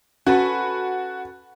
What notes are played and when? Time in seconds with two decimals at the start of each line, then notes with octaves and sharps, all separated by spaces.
0.27 C#4 F#4 A4 B4